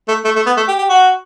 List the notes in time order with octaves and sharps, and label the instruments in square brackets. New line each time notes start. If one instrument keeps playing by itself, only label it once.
[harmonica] A3
A3
A3
B3
A3
G4
G4
F#4